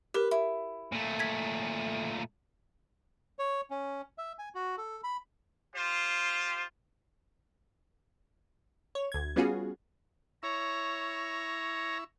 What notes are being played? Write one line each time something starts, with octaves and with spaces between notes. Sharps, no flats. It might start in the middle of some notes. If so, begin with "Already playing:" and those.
G4 A#4 B4
E4
A#2 A3
G#6 B6
C#5
C#4
E5
G#5
F#4
A4
B5
F4 G4 C5
C#5
D2 G#6
G3 B3 C#4 F4 F#4 G#4
E4 C#5 A#5 C#6 E6